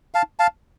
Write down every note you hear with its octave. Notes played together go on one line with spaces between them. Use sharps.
F5 A5
F5 A5